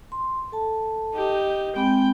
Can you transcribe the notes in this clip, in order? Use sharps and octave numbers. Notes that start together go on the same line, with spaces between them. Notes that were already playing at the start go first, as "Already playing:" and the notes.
C6
A4 A5
D#4 G4
G#3 C4 G5 B5